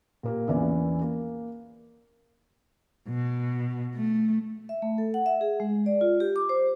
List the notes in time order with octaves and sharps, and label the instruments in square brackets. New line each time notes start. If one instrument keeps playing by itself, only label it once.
[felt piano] A#2 A#3 G4
A#1 E2 E3 C#4 B4 D5
A#3
[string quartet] B2
A3
[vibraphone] E5
A3
A4
F#5
E5
G#4
G#3
D5
F4
G4
D6
C5